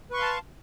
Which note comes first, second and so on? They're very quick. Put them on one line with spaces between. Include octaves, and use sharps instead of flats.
B4 C#6 C6 F5 A5